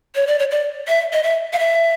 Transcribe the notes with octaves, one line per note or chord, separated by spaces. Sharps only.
C#5
D5
C#5
D5
E5
D#5
E5
F5
E5